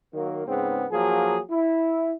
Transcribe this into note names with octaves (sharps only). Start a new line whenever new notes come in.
D#3 F#3 A#3
G#2 C#3 B3 C4
F3 F#3 A#3 G#4
E4